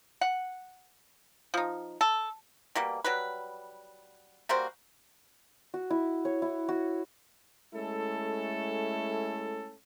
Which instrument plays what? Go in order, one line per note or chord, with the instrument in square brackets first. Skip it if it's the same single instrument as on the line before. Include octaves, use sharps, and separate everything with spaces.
[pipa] F#5
F3 D#4
A4
B2 G3 A#3
F#3 G3 B4
G3 A#3 F#4 C5
[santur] F#4
E4
C#5
E4
F#4
[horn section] G#3 A3 C#4 E4 A4